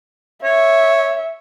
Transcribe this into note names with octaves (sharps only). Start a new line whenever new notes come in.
C#5 E5